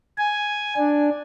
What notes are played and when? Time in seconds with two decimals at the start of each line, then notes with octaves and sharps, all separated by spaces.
0.18 G#5
0.77 D4